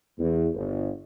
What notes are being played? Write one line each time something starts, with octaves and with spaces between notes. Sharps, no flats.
E2
G1